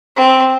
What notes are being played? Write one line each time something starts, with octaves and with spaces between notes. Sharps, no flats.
C4